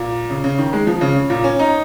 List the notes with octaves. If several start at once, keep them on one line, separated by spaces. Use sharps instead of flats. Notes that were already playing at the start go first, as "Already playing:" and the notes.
Already playing: A#2
C#3
C#3
D#3
G#3
F3
C#3
A#2
C#4
D#4